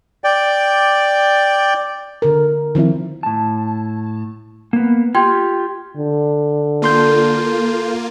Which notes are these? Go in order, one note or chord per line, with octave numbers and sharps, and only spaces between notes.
D5 G5
D3 A#4
D#3 F3 C4 E4
A2 A5
A#3 B3
F4 G4 G5 C6 G#6
D3
A#3 F4 A4 C6 G6